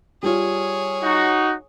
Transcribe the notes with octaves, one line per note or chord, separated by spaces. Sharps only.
G3 F4 G#4 C#5
D#4 F#4